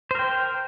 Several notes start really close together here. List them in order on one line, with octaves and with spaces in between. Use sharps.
C5 A#4 G5